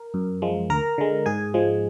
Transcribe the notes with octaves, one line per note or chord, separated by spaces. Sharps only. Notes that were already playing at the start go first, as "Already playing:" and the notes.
Already playing: A#4
F#2
F3 G#3
D2 A#4 A#5
D3 G#3
G#2 G#4 G#5
F3 G#3